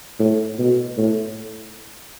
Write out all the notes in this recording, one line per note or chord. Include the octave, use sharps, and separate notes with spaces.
A2
B2
A2